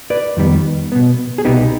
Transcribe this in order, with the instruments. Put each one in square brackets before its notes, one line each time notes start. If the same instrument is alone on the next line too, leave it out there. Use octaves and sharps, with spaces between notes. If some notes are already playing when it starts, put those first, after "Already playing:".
[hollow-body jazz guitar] B4 D5
F2 D#3 G3 B3
B2 B3
G#4
C2 B2 B3 D#4 G4